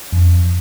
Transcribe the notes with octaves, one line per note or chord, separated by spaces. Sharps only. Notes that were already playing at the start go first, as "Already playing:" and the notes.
F2